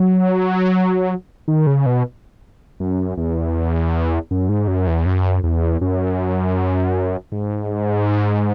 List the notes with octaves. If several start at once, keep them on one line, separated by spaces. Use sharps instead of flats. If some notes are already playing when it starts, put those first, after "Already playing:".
Already playing: F#3
D#3
C#3
B2
F#2
E2
F#2
G#2
F#2
E2
F#2
E2
F#2
G#2